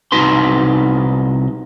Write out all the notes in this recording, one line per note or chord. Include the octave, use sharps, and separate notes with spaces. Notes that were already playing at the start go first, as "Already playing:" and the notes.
C2 D#4 F#4 B4 C6